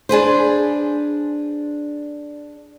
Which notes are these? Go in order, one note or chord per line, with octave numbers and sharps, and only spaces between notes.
D4 G#4 B4 C5